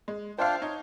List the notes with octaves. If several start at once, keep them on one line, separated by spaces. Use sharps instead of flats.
G#3
D4 F4 C5 E5 F5 G5
D#4 C#5